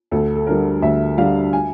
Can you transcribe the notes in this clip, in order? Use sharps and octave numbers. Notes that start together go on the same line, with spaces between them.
D2 A4
A4
D3 G3 A#4
D2 E5
D3 G3 F5
G#5